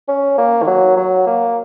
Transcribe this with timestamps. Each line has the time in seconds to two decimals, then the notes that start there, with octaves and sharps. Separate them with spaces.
0.08 C#4
0.38 A#3
0.63 D#3
0.67 F#3
0.97 F#3
1.27 A#3